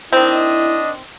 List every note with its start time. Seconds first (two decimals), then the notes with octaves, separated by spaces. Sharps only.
0.13 D#3 C4 D4 E4 D#5